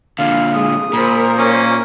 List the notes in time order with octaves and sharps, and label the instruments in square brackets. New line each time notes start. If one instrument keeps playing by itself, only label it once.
[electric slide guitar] A#2 D3 [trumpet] F5
[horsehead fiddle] G#3 [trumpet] D#6
[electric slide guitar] A#2 [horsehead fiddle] A#4 C5 [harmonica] B5
[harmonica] A#3 C#4